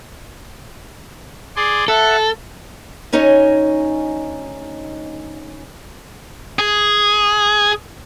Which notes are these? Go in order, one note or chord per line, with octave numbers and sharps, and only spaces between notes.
G#4 D5 C6
A4 E5 F#5
D2 C#4 D#4 C#5 D#5 G#5
G#4